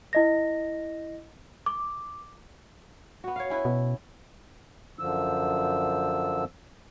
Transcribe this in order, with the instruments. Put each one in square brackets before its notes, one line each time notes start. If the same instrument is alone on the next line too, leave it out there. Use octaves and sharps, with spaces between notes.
[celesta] E4 D#5 A#6
D6
[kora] B3 F#4
C#5 F5
C#4 E4 B4
[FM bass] B2
[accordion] F#2 D3 F3 E6